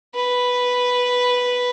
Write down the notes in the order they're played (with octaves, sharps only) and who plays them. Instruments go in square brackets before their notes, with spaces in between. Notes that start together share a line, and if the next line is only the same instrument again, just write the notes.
[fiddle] B4